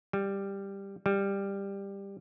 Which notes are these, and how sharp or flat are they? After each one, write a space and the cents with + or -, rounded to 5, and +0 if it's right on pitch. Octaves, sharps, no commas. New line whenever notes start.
G3 +10
G3 +15